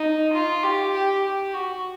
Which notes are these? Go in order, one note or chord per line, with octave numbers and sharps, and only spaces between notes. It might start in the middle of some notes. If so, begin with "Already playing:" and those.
Already playing: D#4
F4
G4
G4
G4
F#4